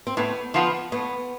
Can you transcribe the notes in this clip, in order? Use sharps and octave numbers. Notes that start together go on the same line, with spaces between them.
C4
A2 B3
F3 B3 F4 B4
A2 B3